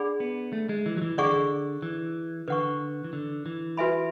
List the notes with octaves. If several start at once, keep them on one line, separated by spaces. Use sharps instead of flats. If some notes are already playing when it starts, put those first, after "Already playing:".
Already playing: D4 G#4 D5 F#5 B5
B3
A3
G#3
E3
F#3
E3
D3 G#4 D5 F#5 C#6
E3
D3 B4 F#5 C#6
E3
D3
E3
F#4 B4 E5 G#5 B5